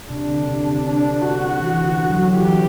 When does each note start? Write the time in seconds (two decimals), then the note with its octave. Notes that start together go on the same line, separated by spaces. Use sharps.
0.10 C3 D4
0.29 D3
0.48 C3
0.67 D3
0.85 D3 D4
1.22 F#4
1.60 E3
1.85 D3
2.10 F#3
2.34 E3 E4 G4